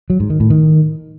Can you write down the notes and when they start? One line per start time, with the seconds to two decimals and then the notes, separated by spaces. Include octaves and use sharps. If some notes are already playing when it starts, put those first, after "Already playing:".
0.10 F#3
0.20 G#2
0.30 D#3
0.40 A2
0.50 D#3